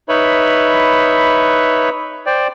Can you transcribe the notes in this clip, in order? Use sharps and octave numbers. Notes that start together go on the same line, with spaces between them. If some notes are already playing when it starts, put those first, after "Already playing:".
D#4 B4 C#5 E5 B5
C5 D5 G5